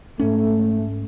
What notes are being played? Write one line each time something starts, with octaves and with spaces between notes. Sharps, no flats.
G#2 A3 C#4